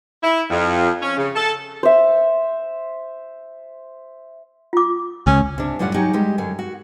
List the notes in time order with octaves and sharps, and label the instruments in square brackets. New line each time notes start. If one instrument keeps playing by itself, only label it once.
[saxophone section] E4
F2
C#4
C#3
A4
[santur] C5 E5
[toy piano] F4 D6
[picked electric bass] C#2 [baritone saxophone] C#4
[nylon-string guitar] C3 D4
F#2 A2 G3 F4 D5 F#5
F#3 D#4 G4 F#5 G#5
G3 G#3 G4
F#2 D3 G#5
F#4